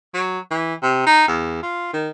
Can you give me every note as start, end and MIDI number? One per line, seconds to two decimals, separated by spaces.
0.14 0.39 54
0.50 0.74 52
0.82 1.03 48
1.06 1.24 63
1.28 1.59 40
1.62 1.90 65
1.93 2.09 51